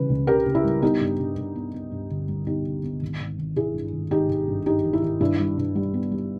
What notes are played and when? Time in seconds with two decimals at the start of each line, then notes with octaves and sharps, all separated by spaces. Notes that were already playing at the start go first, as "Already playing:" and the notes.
Already playing: C#3 E3 G3 B4
0.09 C#2
0.27 C#3 G4 A#4
0.46 C#3
0.55 E4
0.65 G3
0.82 B3 D#4 G4
1.01 G2
1.20 G2
1.38 G2
1.56 B3
1.74 B3
1.92 G2
2.10 G1
2.29 G3
2.47 B3 D#4 G4
2.65 G1
2.83 B3
3.02 G#1
3.20 G#1
3.38 G#1
3.56 G#1 E4 G#4
3.74 G2
3.93 G#1
4.11 G#1 D#4 G4
4.29 G#1
4.48 G2
4.66 G2 D#4 G4
4.85 D#3
4.93 E4
5.02 D#3
5.21 G2 E4
5.39 G3
5.58 G2
5.76 G3
5.94 B3
6.12 G3